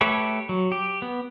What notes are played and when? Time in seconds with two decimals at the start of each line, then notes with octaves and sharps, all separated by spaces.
0.01 A3 G4 A4 B4 C#5
0.49 F#3
0.72 G4
1.02 B3